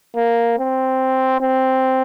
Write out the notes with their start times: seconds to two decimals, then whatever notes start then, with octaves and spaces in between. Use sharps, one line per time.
0.16 A#3
0.59 C4
1.41 C4